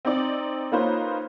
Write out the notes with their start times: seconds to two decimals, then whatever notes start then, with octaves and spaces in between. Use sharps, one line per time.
0.05 C4 D#4 D5
0.72 A#3 C#4 D#4 F4 B4 C5